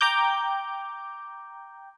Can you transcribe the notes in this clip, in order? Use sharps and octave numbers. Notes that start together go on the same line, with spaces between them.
G5 A#5 D6 G6